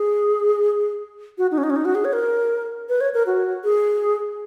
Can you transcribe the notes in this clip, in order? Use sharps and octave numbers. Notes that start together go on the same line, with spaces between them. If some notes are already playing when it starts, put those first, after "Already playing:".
Already playing: G#4
F#4
D#4
C#4
D#4
C#4
D#4
F#4
G#4
C#5
A#4
B4
C#5
A#4
F#4
G#4